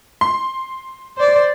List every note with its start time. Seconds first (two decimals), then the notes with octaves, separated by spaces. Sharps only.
0.21 C6
1.17 C5 D5